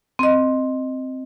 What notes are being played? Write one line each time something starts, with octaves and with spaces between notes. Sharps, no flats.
C4 D#5